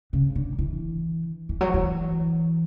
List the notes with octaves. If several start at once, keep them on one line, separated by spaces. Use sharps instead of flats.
C#3
D3
E3
E3
F#3
E3